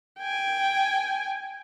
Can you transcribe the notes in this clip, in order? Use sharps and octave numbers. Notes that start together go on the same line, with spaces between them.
G5 G#5